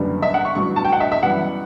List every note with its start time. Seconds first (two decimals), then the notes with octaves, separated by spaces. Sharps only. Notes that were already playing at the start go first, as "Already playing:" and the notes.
Already playing: F#1 F#2 D3 G3 B3
0.22 E5
0.34 F#5
0.45 C#6
0.55 A1 G2 F#3 C#6
0.76 A5
0.84 G5
0.92 F#5
1.00 E5
1.12 E5
1.22 F#2 E3 G3 B3 F#5